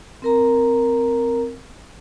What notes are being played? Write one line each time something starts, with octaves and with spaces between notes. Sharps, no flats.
C4 A#4 A#5